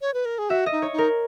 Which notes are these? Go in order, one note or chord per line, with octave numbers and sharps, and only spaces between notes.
C#5
B4
A#4
G#4
F#4 E5
D#5
D#4
C#5
D#4
A#4